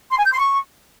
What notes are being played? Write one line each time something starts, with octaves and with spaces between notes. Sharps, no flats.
C6
G#5
G6
C6
C#6